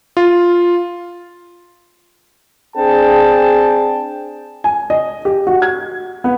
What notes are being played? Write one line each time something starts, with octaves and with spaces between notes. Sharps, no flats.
F4
C4 D4 G#4 G5 A5
G#5
D#5
G4
F#4
G#6
B3